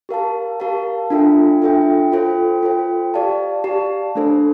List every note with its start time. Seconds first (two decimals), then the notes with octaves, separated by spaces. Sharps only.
0.09 G4 A#4 F5 A5
0.60 G4 A#4 F5 A5
1.10 D4 F4 A4 E5 G5
1.62 D4 F4 A4 E5 G5
2.12 F4 A4 C5 G5
2.63 F4 A4 C5 G5
3.14 G4 D5 F5 A5
3.64 G4 D5 F5 A5
4.15 A3 D4 A4 C5